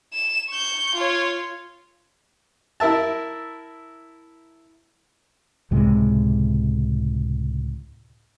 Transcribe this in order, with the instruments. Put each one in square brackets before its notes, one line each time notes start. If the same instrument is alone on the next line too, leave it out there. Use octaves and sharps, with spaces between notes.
[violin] E7
C#6 G6
F4 C#5
[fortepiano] E4 A#4 E5 A5
[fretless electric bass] C#2 A2 C3 G#3